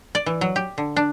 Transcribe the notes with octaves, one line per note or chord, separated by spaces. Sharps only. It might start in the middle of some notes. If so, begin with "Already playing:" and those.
D5
E3
F#3
G4
D3
D4